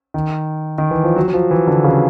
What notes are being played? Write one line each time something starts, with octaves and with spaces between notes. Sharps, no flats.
D#3
D#3
E3
F3
F#3
F#3
F3
E3
D3
C#3